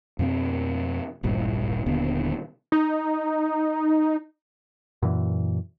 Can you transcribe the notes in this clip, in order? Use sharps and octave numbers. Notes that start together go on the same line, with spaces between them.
F2 B2 B3 C4
D#1 G#1 G2 A#2
D#1 D#2 D3 B3
D#4
F#2 A#2 E3